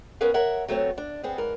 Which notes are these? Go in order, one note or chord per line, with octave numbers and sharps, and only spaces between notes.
B3 C#4 A#4 B4 F5
A#4 C#5 E5 F#5
F#3 A3 B3 C4 C#5
D4
B3 C4 G#4
G#2 A#4 B4